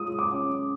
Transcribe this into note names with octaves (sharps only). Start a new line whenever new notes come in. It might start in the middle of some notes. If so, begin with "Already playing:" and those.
Already playing: G#3 F4 D#6
D6
C#4